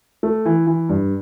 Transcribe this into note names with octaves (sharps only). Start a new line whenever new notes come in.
A3
E3
E3
G2